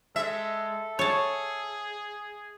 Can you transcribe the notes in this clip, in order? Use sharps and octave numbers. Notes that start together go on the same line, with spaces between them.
G#3 A4 E5
G#4 C#5 A5